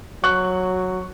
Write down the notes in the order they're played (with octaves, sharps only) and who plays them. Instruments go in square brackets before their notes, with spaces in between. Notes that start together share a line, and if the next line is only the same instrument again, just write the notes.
[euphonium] F#3 [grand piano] C#6 F#6